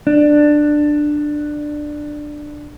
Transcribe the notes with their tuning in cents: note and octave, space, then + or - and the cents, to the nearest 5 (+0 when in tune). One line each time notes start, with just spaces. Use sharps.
D4 +15